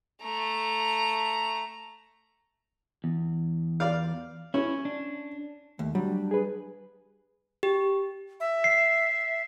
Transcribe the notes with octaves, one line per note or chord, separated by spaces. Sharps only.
A3 A#5
E2
D5 F5
C#4 E4
D4
D#2 A3
F#3 G3 D4
G#4 B4
G4
E5
C7